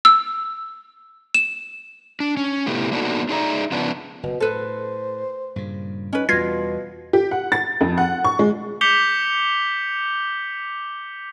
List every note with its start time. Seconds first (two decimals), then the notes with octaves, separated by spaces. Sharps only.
0.05 E6
1.34 E7
2.20 D4
2.37 C#4
2.66 A2 C3 A3 B3 E4 G4
2.92 A#3 B3 D4 D#4 F#4 A4
3.29 D4 D#4 G#4 D5 E5 A#5
3.72 C#3 F3 B3 D4
4.23 F#1 B2
4.40 A2 A4 B4 C5
5.56 G2 A#2 C#3
6.13 C#4 D#4 B4
6.29 E2 B2 G3 F4 G#6 A#6 C7
7.13 G4
7.31 F#5
7.52 A6
7.81 F2
7.98 F#5
8.24 C#6
8.39 G#3
8.81 D6 G6 B6 C#7 F7 G7